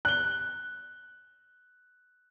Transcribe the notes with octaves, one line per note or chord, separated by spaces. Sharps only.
F#6 G7